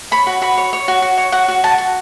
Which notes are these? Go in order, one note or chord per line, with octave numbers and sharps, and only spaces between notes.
C#5 B5
F#4
F#4 B5
C#5
C#5
F#4
F#4
C#5
F#4 F#5
F#4
F#4 A5
F#4